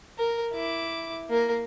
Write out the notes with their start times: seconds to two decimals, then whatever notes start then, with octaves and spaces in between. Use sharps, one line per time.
0.18 A#4
0.53 E4 D6
1.30 A#3 A#4